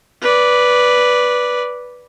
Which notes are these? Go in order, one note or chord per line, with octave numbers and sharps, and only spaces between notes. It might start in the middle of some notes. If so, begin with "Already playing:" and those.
B4 D5